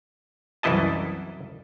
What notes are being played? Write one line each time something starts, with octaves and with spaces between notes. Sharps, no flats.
C2 F#2 E3 E4 D#5 A5